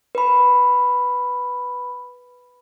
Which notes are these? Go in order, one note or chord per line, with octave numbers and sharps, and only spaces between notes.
B4 B5